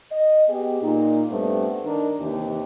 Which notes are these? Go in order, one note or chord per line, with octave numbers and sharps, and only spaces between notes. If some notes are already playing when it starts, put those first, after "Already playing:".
D#5
B3 G4 G#4
A#2 D#4
G2 A3 B3 C4
D#3 D4 A#4
D#2 C3 E3 G4